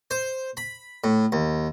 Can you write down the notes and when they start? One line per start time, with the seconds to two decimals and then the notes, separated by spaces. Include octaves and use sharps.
0.11 C5
0.57 B5
1.04 A2
1.32 D#2